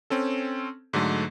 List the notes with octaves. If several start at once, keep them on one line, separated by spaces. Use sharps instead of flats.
C4 C#4 A4
G#2 D3 F#3 A3